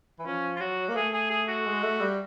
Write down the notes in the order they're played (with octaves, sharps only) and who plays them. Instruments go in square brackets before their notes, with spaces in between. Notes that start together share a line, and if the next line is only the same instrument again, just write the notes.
[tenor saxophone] E3
[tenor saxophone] F3 [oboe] C#4
[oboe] F4
[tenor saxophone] F#3 [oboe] F#4
[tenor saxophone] A#3
[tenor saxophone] A3 [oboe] G#4
[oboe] G#4
G#4
F#4
[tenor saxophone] G#3
A3
G3